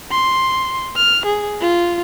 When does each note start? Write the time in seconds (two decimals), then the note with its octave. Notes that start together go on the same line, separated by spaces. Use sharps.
0.11 C6
0.96 F6
1.26 G#4
1.61 F4